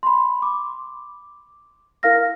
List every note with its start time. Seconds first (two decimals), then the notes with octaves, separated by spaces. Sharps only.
0.03 B5 C6
0.42 D6
2.03 E4 A#4 F5 F6 A#6